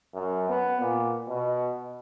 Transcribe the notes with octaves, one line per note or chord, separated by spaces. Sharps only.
F#2
B3
A#2
B2